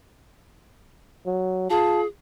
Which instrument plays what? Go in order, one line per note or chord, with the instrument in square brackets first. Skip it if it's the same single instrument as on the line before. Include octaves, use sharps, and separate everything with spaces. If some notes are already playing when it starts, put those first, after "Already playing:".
[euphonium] F#3
[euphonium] F4 [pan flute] G#4 [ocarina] A5